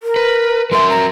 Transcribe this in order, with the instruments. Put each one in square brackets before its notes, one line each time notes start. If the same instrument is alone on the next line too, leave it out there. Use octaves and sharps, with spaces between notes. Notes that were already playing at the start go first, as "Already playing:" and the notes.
[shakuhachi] A#4
[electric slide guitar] B4
[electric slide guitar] F#3 A#4 E5 [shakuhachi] C6
[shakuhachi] A#5